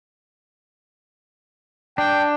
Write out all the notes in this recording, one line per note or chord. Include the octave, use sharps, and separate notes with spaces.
D4 G5